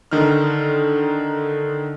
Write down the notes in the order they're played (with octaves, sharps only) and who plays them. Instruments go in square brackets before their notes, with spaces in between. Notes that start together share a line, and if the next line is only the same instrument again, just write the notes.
[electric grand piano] D3 D#3 D#4 F6